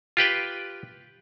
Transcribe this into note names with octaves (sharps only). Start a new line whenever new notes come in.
F4 G4 B4 G5